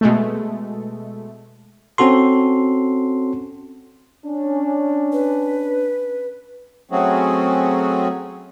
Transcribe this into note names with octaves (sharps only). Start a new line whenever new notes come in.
B2 G#3 A3
C4 C#4 F#4 A4 C6
C#4 D4
B4
F#3 A3 C4 C#4 F#4 G#4